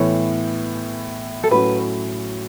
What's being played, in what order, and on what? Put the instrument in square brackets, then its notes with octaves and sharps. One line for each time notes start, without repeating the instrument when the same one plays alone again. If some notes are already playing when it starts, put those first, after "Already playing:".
Already playing: [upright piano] A2 E3 B3 [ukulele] C#5
[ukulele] A4
[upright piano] A2 F#3 C#4 F#4 [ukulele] B4